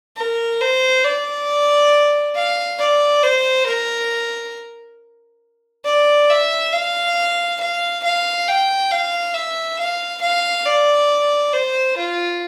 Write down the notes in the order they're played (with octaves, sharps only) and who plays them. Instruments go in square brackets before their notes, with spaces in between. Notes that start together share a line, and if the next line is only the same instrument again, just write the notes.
[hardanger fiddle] A#4
C5
D5
F5
D5
C5
A#4
D5
E5
F5
F5
F5
G5
F5
E5
F5
F5
D5
C5
F4